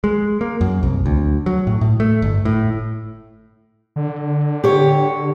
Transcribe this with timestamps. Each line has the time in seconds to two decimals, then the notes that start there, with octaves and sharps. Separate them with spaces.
0.04 G#3
0.41 A#3
0.61 F#2
0.83 C2
1.06 D2
1.46 F#3
1.67 A2
1.81 A2
2.00 A3
2.22 G1
2.45 A2
3.96 D3
4.64 G4 C#5